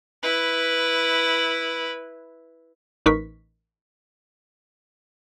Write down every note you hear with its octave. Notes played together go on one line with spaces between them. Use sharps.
E4 B4
A1 D#4 A#4 B4 C#6 B6